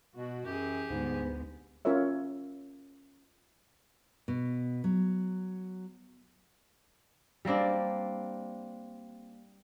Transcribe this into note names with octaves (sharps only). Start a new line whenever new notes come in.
B2 B3 F#4
F#2 E3 G4 G#4
D2 G#2 G#3 B3
C#4 F4 A#4 C#5 E5
B2
F#3
G3 A#3 C4 D4